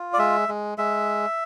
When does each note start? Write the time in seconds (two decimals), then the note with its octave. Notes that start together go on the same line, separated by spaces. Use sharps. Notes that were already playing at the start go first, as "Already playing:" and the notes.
Already playing: F4
0.13 D5
0.18 G#3 E5
0.49 G#3
0.78 G#3 E5